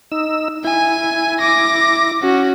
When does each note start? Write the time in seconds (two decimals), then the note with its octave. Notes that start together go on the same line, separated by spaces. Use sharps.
0.12 D#4 E6
0.64 E4 G#5
1.40 D6 A#6
2.22 C#4 F#4